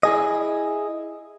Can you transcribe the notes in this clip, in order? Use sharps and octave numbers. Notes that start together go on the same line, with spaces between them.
E4 G#4 D#5